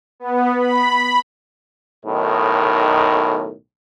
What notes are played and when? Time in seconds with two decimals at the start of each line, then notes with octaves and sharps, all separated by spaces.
0.20 B3
0.59 B5
2.06 B1 A2 D#3